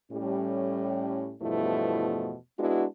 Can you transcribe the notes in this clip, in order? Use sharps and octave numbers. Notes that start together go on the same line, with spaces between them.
A2 G3 C#4
E2 G2 B2 F3 A3 E4
G#3 B3 D4 E4 F#4